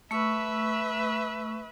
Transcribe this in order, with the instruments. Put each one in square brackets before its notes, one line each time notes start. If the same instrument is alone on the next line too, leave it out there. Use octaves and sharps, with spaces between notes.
[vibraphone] A3 C#6 E6 [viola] B4 E5